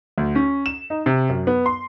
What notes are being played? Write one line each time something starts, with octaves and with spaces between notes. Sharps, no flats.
D2
C#4
E7
D#4
C3
F#2
B3
C6